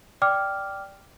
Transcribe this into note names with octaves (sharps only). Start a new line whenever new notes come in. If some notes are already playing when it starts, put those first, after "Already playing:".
D5 G5 D6 F6